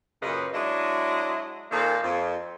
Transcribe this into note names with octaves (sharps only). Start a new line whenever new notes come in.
F#2 A#2 C#3 B4 D#5
F#3 G#3 D4 E4 D#5
A#2 D#3 A#3 C4 A4
F2